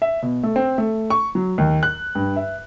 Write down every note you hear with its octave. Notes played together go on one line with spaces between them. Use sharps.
E5
B2
A3
C4
A3
C#6
F#3
D#2
F#6
G2
E5